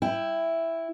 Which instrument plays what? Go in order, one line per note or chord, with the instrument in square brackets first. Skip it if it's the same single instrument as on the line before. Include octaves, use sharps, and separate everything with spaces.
[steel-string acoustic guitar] E4 G5